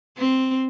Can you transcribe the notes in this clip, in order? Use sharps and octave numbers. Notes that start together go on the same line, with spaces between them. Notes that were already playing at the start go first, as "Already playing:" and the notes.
C4